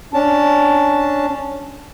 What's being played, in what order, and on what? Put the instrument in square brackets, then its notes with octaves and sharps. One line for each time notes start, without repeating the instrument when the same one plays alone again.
[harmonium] C#4 D4 A5